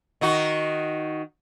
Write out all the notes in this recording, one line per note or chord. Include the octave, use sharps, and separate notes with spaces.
D#3 D#4 F#4